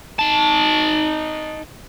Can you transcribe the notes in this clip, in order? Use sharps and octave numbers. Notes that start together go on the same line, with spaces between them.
D#4 A5